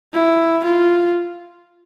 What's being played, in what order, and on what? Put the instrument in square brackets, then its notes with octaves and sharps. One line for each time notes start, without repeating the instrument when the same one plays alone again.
[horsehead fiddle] E4
F4